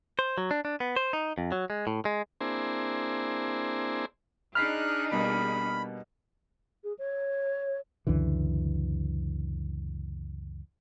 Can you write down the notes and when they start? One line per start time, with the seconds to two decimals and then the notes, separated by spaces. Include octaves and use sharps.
0.19 C5
0.38 F#3
0.51 D4
0.65 D4
0.80 B3
0.96 C5
1.13 D#4
1.38 F2
1.52 F#3
1.70 G#3
1.87 A2
2.05 G#3
2.41 A#3 C4 D4 E4 G#4 C5
4.55 D4 D#4 G#4 B5 F6 F#6 B6 C7
5.11 B2 G3 A#3 B5
6.84 G#4
6.98 C#5
8.07 C#2 F#2 D3 E3